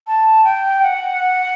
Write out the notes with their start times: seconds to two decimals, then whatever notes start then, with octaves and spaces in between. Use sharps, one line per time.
0.07 A5
0.44 G5
0.82 F#5